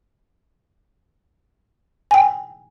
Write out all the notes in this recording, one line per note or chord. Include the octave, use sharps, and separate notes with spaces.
G5 G#5